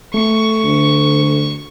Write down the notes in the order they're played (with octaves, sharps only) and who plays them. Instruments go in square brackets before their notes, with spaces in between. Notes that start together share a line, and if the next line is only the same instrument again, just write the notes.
[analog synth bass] A3 [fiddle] C#6
[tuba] D2